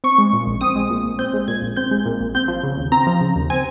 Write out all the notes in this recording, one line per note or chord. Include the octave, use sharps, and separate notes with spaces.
C4 C#6
G#3
A#2
A#1
C4 D#6
G#3
A#2
A#1
C4 G6
G#3
A#2 G#6
A#1
C4 G6
G#3
A#2
A#1
C4 G6
F3
C#3
D#2
C4 A#5
F3
C#3
D#2
C4 G#5